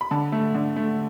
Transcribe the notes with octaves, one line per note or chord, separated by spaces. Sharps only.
B5
D3 A5
A3
D3
A3